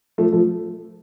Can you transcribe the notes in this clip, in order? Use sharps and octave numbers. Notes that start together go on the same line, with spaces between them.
F3 A3
F3 A3